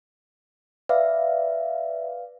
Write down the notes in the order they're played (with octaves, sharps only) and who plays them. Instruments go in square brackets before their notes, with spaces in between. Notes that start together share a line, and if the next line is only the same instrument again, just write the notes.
[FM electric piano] B4 D5 F5 [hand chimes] E5